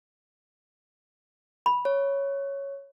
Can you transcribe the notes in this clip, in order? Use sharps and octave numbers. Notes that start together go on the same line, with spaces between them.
B5
C#5